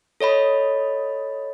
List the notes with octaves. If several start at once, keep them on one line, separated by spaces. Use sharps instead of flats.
A4 C#5 D#5 B5